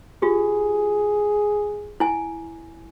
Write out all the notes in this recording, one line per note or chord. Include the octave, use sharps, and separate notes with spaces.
F4 G4 G#4
E4 G#5